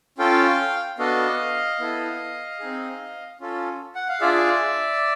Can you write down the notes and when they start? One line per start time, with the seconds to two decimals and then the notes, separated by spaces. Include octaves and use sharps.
0.18 C#4 F4 A4 F5 G5
0.99 B3 D4 F#4 A4 D#5 F5
1.79 B3 E4 A4
2.59 C4 D#4 G#4
3.40 C#4 F4 A4
3.95 F#5
4.09 F5
4.21 D4 F4 G#4 D5 E5